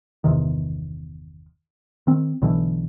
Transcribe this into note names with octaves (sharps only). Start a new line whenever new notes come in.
G1 E2 C3 D#3
D#3 C4
B1 B2 D3 E3